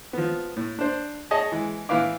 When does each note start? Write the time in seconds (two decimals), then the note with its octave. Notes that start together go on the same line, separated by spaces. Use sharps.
0.13 F3 B3
0.56 A2
0.79 D4 C5
1.31 G#4 C#5 D#5 A5
1.52 E3 G#3
1.89 A2 E3 E4 B4 F5 D6